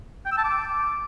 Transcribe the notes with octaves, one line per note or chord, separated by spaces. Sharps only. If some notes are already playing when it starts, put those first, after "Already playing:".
G5
E6
A5
D6